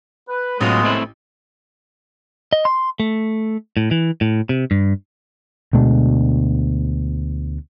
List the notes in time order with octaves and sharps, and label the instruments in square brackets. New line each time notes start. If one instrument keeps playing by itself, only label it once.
[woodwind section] B4
[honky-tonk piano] A1 [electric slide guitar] A2 F#3 F4 [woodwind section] G#3 B3
[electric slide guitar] A3 C4 E4
[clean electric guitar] D#5
C6
A3
A2
E3
A2
C3
G2
[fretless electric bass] D2 B2 G#3 D4